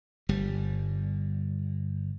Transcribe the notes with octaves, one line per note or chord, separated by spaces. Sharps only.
G1 G3